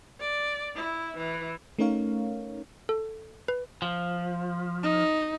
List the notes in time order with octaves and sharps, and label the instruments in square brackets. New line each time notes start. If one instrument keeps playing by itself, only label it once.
[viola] D5
E4
E3
[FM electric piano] A3 C#4 D#4 A#4 C#5 F5
[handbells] A4
B4
[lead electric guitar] F3
[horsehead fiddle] D#4